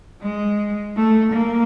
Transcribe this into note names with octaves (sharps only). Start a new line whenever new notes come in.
G#3
A3
A#3